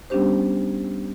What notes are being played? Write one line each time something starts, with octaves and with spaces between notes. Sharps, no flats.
G3 B3 C#4 D4 G4 C5